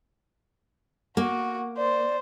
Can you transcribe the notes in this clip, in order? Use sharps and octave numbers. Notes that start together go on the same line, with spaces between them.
A#3 F#4
C5 D5